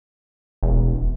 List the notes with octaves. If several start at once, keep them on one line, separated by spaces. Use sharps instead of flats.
E1